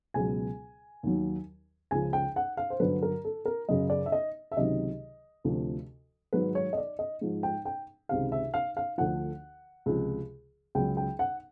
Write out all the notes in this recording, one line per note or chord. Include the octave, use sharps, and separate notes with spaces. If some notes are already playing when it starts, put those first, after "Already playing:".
C#2 B2 F#3 G#5
D#2 D#3 F#3
C#2 C#3 F3 G#5
G5
F#5
F5
C5
G2 D3 F#3 B4
A#4
A4
A#4
F#2 C#3 F#3 D#5
D5
E5
D#5
E5
C#2 C3 D#3 F#3 D#5
D2 C3 F3
G#2 D#3 F#3 B4
C#5
D#5
D5
D#5
G#2 F3
G5
G5
C#2 C3 D#3 F5
E5
F5
F5
D2 D3 F3 F#5
C#2 C3 F3
C#2 C#3 F#3 G5
G5
F#5